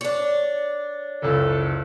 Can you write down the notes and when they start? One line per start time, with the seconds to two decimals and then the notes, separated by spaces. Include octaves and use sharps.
0.01 D4 C#5
1.22 F#1 C#2 A4